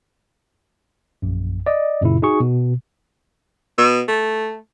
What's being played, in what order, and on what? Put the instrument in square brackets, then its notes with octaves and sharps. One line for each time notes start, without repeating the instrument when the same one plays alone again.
[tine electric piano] A#1 F#2
D5 D#5
F#2 A#2 C#3 E4
D#4 F#4 G#4 C#6
B2
[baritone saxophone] B2
A3